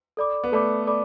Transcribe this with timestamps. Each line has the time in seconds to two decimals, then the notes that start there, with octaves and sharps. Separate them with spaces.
0.17 A4 D5 B5 D6
0.44 B3
0.52 A3 A4 D5 B5 D6
0.87 A4 D5 B5 D6